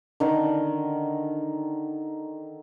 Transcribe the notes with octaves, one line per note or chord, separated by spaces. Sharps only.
D3 D#3